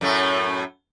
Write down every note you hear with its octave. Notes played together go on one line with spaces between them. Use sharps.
F#2 A2 A3